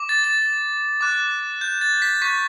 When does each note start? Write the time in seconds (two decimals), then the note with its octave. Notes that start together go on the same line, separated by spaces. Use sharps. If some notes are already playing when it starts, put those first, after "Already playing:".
Already playing: D6
0.09 A6
0.24 A6
1.01 D6 F#6
1.61 G6
1.81 A6
2.02 B6
2.22 C#6 G6 B6